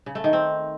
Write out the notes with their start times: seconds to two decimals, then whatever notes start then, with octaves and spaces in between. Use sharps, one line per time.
0.06 C#3
0.15 A3
0.24 D#3
0.33 C4